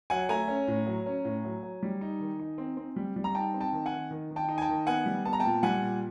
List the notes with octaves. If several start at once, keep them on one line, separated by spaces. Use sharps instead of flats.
F#3 F#5 G#5
A3 G#5 A#5
C#4
A2
F#3
C#4
A2
F#3
F#3
G3
D#4
D#3
D#4
C4
C4
G3
G3
A#5
D#4 G5 A5
C4
G5 A5
D#3
F#5 G#5
D#3
D#3
D#3
G5 A5
D#4
G#5
G5 A5
D#3
B3 F#5 G#5
G3
B3 A5
A#5
A#2 G5 A5
G3 F#5 G#5
A#2